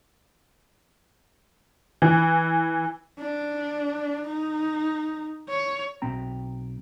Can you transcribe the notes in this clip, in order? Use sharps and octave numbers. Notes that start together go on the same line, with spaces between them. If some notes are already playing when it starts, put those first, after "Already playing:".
E3
D4
D#4
C#5
B1 C4 G5 A#5